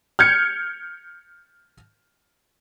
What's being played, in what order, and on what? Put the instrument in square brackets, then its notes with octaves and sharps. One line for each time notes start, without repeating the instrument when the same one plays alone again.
[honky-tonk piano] F6 G6 G#6 C#7